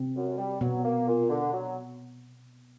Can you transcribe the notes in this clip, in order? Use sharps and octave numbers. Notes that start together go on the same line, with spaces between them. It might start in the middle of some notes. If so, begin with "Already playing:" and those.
Already playing: C3 C4
F#2
G3
B2 F#3 B3
A#3
A#2
D3
F#3